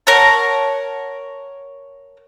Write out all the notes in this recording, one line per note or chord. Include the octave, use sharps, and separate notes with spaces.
A#4 C#5 F#5 A5